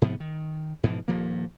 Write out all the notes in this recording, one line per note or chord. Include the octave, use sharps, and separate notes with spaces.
G#2 C3 F3 B3
D#3
G#2 B2 E3 F3
D#1 G2 F3 A#3